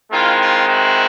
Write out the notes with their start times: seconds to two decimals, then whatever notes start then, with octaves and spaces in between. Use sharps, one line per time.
0.11 D#3 G#3 C4 E4 F4
0.40 F4
0.68 E4 F#4